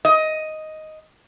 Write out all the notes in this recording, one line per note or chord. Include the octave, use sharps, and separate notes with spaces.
D#5